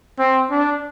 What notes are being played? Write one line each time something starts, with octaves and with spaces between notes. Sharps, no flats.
C4
D4